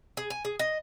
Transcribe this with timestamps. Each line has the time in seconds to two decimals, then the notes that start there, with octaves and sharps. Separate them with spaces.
0.17 G#4
0.30 G#5
0.45 G#4
0.59 D#5